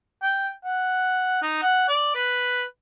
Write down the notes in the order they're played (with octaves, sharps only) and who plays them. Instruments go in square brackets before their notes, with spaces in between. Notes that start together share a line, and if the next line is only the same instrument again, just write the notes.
[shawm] G5
F#5
D#4
F#5
D5
B4